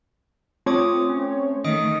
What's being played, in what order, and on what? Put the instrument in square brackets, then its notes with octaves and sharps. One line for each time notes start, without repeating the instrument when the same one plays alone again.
[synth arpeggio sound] A3 C4 C#5 [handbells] F4 D6 D#6
[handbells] C#4
[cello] D#3 A3 [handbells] D#5 D#6 D7